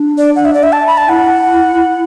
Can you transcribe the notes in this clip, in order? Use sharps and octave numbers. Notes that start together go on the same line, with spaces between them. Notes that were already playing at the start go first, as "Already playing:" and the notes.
Already playing: D4
D5
F#5
E5
D5
E5
A5
B5
A5
E4 F#5